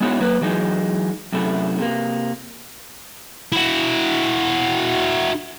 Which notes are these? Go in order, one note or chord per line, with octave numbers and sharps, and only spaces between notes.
G#3 B3 D#4 E4 F#4 C#5
F#3 A#3 B4
E3 F#3 G#3 D#4
F#2 C3 A3 E4
C3 A#3
E4 F#4